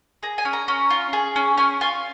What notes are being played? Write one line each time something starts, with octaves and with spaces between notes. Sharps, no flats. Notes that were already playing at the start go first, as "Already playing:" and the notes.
G#4 A#5
G#5
C#4
A#5
C#4
F4
G#4
C#4
C#4 G#5
F4 G#5